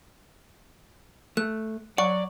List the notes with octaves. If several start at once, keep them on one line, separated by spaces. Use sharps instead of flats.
A3 F#6
F#3 D5 F#5 C#6